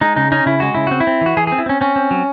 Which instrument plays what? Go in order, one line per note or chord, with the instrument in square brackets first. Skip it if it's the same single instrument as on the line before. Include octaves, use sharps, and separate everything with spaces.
[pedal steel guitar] G#3 D#4
C#3 D#4
C#4 D#4
C#3 E4
G#3 F#4
C#3 E4
C4 F#4
E4
C4
E3 F#4
E3 G#4
C4 G#4
E4
C4 C#4
C4 C#4
C4
F#3